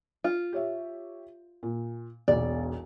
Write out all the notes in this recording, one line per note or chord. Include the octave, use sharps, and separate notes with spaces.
F4
G4 C#5 E5
A#2
E1 B1 D5